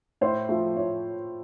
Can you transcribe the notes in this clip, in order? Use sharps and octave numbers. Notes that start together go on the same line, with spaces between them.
A2 C5
F3 A3
A2 C#5